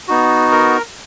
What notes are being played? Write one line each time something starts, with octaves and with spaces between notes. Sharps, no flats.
B3 D#4 F#4
A#4